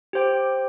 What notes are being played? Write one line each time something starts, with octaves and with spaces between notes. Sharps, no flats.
G4 C5 G5